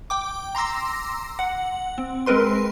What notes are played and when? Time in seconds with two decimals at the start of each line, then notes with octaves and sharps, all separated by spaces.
0.10 G5 D6
0.55 A#5 C6 D6 E6 A#6
1.39 F#5
1.98 C4
2.26 G#3 C4 A#4 B4 C6